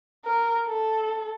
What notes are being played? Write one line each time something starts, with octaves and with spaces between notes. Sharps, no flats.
A#4
A4